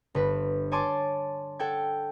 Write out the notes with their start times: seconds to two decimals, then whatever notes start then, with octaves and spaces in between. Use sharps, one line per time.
0.15 G1 B4
0.71 C#5 D5 G#5 A5 C6 D6
1.59 A4 F#5 G5 G#6